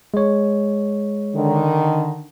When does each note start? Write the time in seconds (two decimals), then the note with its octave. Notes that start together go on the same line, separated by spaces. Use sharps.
0.14 G#3 C#5
1.35 D3 D#3